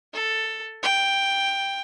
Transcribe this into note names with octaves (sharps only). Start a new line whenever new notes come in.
A4
G5